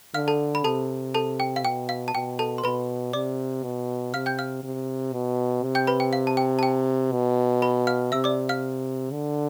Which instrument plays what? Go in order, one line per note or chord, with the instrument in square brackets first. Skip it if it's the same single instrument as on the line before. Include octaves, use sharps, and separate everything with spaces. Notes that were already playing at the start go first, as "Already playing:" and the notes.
[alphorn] D3 [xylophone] F5 F6
[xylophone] A4 A5
B5
[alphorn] C3 [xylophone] A4 A5
[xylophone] A4 A5
G5
F5
[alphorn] B2 [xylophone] G5
[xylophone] F5
A5
[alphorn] B2 [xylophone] G5
[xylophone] A4 A5
C6
[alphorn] B2 [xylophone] B4 B5
[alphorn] C3 [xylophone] D5 D6
[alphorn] B2
[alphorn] C3 [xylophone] F5 F6
[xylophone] G5 G6
F5 F6
[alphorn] C3
B2
C3
[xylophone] G5 G6
B4 B5
G5
F5
A5
G5
A5
G5
[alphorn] B2
[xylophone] B4 B5
F5 F6
[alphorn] C3 [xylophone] E5 E6
[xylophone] D5 D6
F5 F6
[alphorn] D3